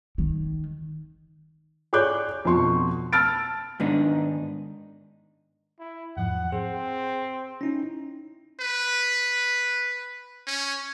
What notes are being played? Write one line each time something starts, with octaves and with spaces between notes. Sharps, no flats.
D#3
G#4 C#5 D5 D6 F#6 G6
F2 B2 C6 C#6
A5 E6 F6 A6 D7
G#2 D#3 B3 D4 D#4
E4
E2 G#2 F3 F#5
C4 G#4
C#4 D#4 E4
B4
C#4